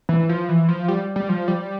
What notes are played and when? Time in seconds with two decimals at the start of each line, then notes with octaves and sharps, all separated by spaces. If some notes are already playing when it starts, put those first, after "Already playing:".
0.09 E3
0.29 F3
0.49 E3
0.69 F3
0.88 G3
1.16 G3
1.29 F3
1.48 G3